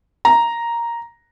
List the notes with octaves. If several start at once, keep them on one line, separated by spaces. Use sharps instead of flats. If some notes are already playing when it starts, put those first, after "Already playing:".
A#5